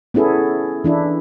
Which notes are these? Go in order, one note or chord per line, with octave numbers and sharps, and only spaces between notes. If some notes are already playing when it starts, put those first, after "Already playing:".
B3 C#4 E4 G#4 A4
E3 D4 E4